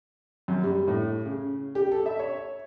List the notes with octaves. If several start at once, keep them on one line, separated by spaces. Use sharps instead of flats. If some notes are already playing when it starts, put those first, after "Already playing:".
F#2
G3
A2
C#3
G4
A4
E5
C#5